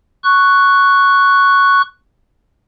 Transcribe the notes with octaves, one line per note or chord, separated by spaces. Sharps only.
C#6 F#6